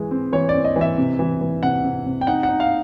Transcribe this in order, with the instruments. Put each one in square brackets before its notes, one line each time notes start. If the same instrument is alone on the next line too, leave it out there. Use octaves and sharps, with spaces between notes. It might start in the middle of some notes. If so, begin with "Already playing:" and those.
Already playing: [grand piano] E3 G#3
C4
E3 C#5
D5
C4
D#5
E3
E5
C3
E3
E3
C3 F#5
C3
C3
G5
D#4 F#5
F#5
D#4
F5